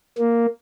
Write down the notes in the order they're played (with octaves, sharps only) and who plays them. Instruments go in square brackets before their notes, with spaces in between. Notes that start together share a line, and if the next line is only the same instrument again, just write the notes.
[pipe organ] A#3